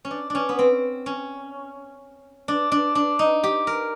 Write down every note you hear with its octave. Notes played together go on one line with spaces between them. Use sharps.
C#4
D4
C#4 D4
B3
C4
C#4
D4
D4
D4
D#4
G4
A#4